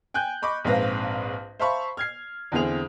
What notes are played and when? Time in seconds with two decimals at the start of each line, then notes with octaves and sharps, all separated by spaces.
0.14 G5 G#5 F#6 G6
0.42 D#5 B5 C#6 D6
0.64 A#1 G#2 C4 B4 F5 A#6
1.60 C5 E5 F5 A5 B5 C#6
1.97 F6 G#6 C7
2.52 E2 D3 C4 E4 G#4 F7